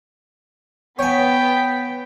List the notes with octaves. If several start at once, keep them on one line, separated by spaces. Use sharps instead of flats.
B3 C#5 G5 G#5 B6